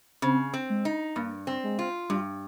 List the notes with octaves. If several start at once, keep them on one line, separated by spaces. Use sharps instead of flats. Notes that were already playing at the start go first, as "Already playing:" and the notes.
C#3 C4
C4
G#3
D#4
G2 A#3
C4
G#3
F4
G2 G3